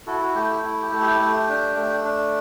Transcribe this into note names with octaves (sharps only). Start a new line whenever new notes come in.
E4 F#4 A4
F#4
A3 G4
G4
E4
G4
A3
G4
A3
D4
A3
D4